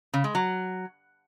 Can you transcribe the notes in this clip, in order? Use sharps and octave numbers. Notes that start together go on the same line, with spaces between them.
C#3
G#3
F#3